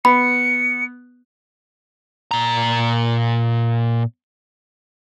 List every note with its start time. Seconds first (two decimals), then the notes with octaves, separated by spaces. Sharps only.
0.05 B3 B5 C#7
2.31 A#2 A#5